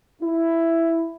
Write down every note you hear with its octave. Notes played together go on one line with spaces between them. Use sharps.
E4